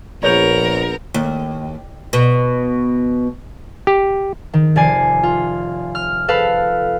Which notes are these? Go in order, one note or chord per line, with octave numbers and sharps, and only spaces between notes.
A#1 B3 A#4 C#5 G6 F7
D#2
B2
G4
D#3
F1 D5 G#5 C7
F4
F6
A4 B4 F5